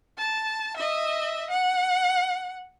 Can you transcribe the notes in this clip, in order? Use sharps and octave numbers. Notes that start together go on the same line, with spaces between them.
A5
D#5 E5
F#5